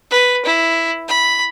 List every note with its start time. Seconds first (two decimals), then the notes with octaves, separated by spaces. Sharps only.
0.11 B4
0.46 E4
1.08 B5